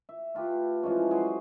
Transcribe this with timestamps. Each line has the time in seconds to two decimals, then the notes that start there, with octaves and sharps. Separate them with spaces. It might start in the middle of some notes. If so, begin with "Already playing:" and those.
0.09 E5
0.34 A3 F4 G4 B4
0.83 E3 F3 G#3 C#4
1.11 F#3 G#4 C6